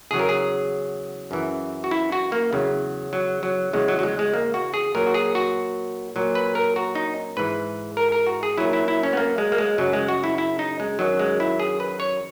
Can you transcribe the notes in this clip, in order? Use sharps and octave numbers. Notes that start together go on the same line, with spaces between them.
E2 C#3 F#3 G#4
A#4
G#4
F#2 E3
F#4
E4
F#4
A#3
E2 C#3 F#3
F#3
F#3
E2 C#3 F#3 G#3
F#3
F#3
G#3
G#3
A#3
F#4
G#4
A#2 F#3 A#4
F#4
G#4
F#4
A#2 F#3
B4
A#4
F#4
D#4
G#2 E3 B4
A#4
A#4
F#4
G#4
A#2 F#3 E4
E4
E4
C#4
B3
A#3
G#3
A#3
G#3
F#2 C#3 F#3
G#3
F#4
E4
E4
D#4
G#3
F#2 D#3 F#3
G#3
E4
G#4
B4
C#5